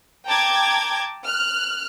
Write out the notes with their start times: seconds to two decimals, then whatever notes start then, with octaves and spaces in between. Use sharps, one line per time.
0.25 G5 A5 A#5 D6 G#6
1.24 F6 F#6